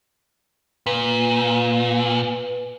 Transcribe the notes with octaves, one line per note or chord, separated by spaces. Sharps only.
A#2 B4